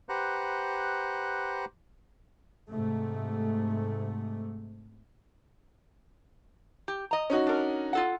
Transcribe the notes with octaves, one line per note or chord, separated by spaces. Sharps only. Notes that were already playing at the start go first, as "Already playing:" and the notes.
G4 B4 C5 F#5 A#5 F#6
G#2 C3 A3
G4
D#5 A#5
C#4 D#4 F#4
D4 A#4
F4 A4 F#5